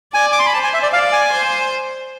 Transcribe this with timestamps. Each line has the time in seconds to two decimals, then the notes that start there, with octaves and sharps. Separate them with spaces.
0.13 D5 G#5
0.32 D6
0.39 C6
0.46 B5
0.54 C5 A5
0.64 G#5
0.74 E5
0.83 D5
0.93 D5 F5
1.12 G#5
1.32 C5